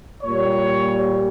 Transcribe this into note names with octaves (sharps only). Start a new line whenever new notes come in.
A#2 G3 C#5